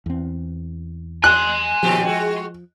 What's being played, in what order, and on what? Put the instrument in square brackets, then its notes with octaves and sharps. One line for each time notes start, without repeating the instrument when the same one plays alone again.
[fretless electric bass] E2 C4
[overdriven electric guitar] G#5 C6 [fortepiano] F#6
[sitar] D#2 A#2 G4 [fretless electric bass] F3
[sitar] G#3 F#4